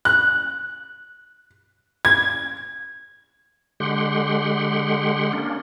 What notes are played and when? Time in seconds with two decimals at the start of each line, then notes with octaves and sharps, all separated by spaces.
0.05 F#6
2.05 G#6
3.80 D3 G#3 G4 F#5 C6
5.33 A#3 C#4 D4